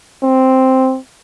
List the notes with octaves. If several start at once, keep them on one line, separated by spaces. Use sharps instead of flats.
C4